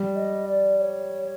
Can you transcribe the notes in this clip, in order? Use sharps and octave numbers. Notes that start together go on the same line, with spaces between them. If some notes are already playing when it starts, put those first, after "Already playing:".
Already playing: G3
D#5
D5
D5
C#5